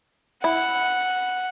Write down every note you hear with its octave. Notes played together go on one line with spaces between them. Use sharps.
E4 F#5